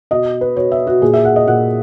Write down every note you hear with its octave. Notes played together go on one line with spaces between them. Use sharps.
B2 D#5
B4
B2 C#5
E5
F#4
A#2 G#4
E5
F#5
D#5
A#2 F#5